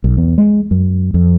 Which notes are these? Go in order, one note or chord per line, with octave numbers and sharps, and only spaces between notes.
B1
E2
G#3
F#2
F2